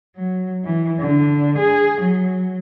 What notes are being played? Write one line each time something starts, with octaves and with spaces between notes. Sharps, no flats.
F#3
E3
D3
G#4
F#3